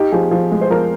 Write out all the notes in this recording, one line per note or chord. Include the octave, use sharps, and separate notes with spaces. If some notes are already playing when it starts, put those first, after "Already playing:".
Already playing: D#4 G4
F3 G#4
F3
G#3
C5
F3 A#4